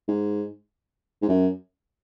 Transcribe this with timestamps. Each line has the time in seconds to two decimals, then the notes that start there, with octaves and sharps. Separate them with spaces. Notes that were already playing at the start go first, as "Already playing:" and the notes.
0.08 G#2
1.22 G#2
1.29 F#2